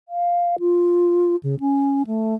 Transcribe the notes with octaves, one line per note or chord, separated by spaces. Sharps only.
F5
F4
C#3
C#4
A3